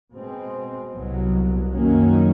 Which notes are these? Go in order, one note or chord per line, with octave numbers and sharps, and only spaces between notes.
B2 G#3 C4
C2 B2 F#3
F#2 D#3 F#3 A#3 C#4